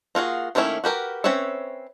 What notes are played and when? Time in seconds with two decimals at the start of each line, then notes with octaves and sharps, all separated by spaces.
0.15 A#3 F4 F#4 G#4
0.55 D#3 A3 A#3 C#4 E4
0.84 F#4 G4 A#4 B4
1.24 C4 C#4 B4 C#5 E5